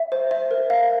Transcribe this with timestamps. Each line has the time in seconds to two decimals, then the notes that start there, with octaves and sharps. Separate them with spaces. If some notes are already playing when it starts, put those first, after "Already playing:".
Already playing: E5
0.12 C5
0.31 E5
0.51 A#4
0.70 F5